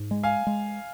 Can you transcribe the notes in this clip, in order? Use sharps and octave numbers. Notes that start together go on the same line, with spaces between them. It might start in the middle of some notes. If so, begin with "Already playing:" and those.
Already playing: G#2
G#3
F5 G#5
G#3